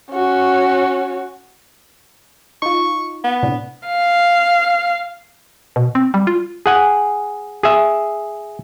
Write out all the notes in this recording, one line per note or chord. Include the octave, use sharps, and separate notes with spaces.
C#4 F#4
D#4 F4 C#6
B3
A2 C3 D4
F5
B2
C4
G3
F4
G#4 F#5 G#5
G#4 E5